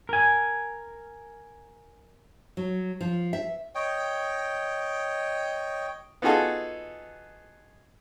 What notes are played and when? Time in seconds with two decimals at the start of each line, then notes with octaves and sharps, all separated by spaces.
0.09 A#4 G#5
2.57 F#3
3.01 F3
3.33 E5
3.75 C#5 D#5 G5
6.22 B3 D#4 F4 F#4 G#4 A4